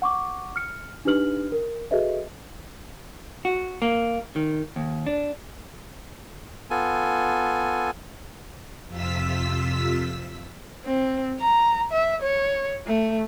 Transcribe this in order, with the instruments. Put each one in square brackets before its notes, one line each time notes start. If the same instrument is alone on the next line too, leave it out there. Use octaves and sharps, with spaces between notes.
[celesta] F#5 C#6 D6
F6 C#7
D4 D#4 G4 B4 F6 F#7
A#4
F#4 G#4 A4 B4 D#5 E5
[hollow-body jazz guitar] F#4
A#3
D#3
D#2
D4
[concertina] B3 F4 A4 G#5
[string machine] F2 C3 F4 E6 B6
[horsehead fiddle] C4
A#5
E5
C#5
A3